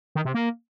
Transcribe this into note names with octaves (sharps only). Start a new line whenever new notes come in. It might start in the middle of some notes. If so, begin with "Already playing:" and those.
D#3
C3
A#3